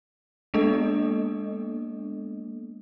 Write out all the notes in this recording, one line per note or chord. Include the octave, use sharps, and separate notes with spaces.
G#3 A#3 B3 D4 A4 D#5